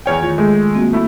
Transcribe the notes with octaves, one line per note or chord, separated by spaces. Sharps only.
E2 C#5 G5 G#5 F6 G#6
D#3 A3 F4
G#3 A3 G6
A#3 C4 F#4
A3 E4